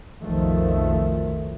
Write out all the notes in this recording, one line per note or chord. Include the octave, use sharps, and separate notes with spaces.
B1 F2 D#3 F3 A3